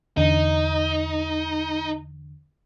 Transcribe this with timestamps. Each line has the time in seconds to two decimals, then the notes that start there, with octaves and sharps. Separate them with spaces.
0.17 E2 D3 D#4